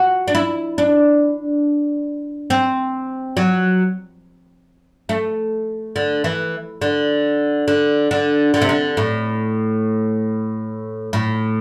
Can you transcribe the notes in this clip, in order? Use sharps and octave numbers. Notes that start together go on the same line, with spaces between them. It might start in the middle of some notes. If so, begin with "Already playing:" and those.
Already playing: F#4
D4
E4
D4
C4
F#3
A3
D3
E3
D3
D3
D3
D3
C3
D3
A2
A2